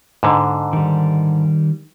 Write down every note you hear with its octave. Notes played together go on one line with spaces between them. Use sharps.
G#2 D3
D#3 G3